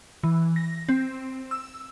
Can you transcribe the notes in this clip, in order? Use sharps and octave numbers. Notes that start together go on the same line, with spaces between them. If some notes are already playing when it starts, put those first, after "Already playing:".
E3
A#6
C4
E6